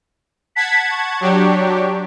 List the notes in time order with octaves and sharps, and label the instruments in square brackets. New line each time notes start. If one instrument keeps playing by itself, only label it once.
[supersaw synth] F#5 A5 G#6 [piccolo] B6
[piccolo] C#6
[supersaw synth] F#3 D4 G4